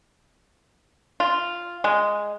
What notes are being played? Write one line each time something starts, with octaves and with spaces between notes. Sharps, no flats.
F4
G#3